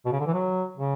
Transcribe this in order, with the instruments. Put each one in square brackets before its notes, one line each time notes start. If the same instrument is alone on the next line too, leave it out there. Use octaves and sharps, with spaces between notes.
[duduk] B2
C#3
D3
E3
F#3
C#3